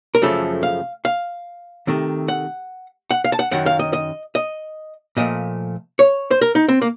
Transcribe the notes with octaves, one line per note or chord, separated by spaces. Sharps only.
A#4
F#2 C#3 F3 A3 A4
F5
F5
C3 D#3 A3
F#5
F#5
F5
A5
F#5
F#2 D#3 F#3 F#5
F5
D#5
D#5
D#5
A#2 F3 A3 D#5
C#5
C5
A#4
D#4
C4
A#3